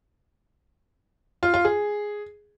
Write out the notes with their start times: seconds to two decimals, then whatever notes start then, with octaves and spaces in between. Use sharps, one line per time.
1.43 F4
1.54 F4
1.65 G#4